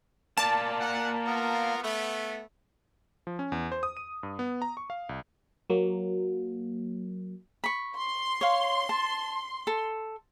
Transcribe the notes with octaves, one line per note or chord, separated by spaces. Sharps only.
A#3 D5 A5
F#5
B3 F4 A#4
A3 B3
F3
C#4
E2
C5
D#6
D#7
G2
B3
A#5
C#6
F5
C2
F#3 A#3
B5 C#6
C6
C#5 F5
A5
A4